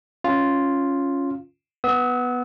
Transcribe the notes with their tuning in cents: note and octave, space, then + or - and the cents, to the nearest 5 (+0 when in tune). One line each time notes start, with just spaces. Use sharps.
C#4 +0 F4 +0
B3 +0 E6 -45